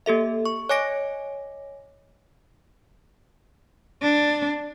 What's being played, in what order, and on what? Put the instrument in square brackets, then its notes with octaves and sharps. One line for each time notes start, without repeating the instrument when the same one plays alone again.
[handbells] A#3 G4 A4 E5
C#6
C#5 D#5 G#5 D6 A#6 D7
[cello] D4